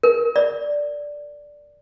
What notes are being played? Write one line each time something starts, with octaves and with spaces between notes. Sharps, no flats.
A#4
D5